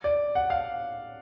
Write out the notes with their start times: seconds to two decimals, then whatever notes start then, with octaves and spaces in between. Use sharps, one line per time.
0.04 D5
0.35 F#5
0.50 F5